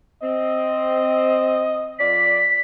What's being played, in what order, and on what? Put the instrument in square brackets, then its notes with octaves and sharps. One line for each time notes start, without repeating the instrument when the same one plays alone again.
[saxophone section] C4 [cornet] D#5
[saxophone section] F2 F4 D5 [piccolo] B6